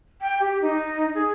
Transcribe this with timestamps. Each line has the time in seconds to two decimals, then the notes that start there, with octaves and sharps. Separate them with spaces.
0.21 G5
0.40 G4
0.62 D#4
1.15 G#4